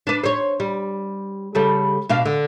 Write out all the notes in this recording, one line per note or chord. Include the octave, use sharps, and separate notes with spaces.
D4 B4
C5 C#5
G3
C#3 G3 A4
B2 D4 F5
D3